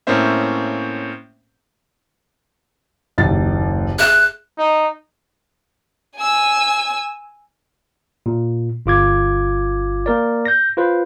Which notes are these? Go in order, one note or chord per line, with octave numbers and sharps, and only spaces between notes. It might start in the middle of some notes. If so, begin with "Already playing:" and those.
A2 A#3 C4 C#4 C5 E5
F#1 D#2 A6
G#4 E5 F#6 E7
D#4
G#5 E6
A#2
G1 F4 D6 G#6
A#3 A#4 D5
G6 A#6
F4 B4 C5